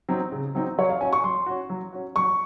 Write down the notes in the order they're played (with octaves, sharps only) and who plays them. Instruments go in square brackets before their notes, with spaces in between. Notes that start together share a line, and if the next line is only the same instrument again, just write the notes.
[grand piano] F#3 C4 D#4
C#3
F#3 C4 D#4
[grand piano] F#3 [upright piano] C#5
[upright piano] F5
[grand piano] C#4 F#4 [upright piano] G#5
[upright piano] C#6
[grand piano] F#3 [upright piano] C6
[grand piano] C#4 F#4
F#3
C#4 F#4
[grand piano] F#3 [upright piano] C#6